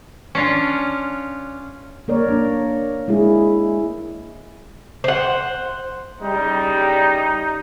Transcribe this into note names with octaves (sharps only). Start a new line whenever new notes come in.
C#4 D4 F4 C#5
A#3 A#4 C#5 D5
A#3 D4
G#3 E4 G#4
C5 F#5
A2 C#3 G3 D#4